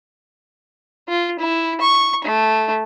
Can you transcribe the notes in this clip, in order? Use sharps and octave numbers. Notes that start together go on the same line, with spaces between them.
F4
E4
C#6
A3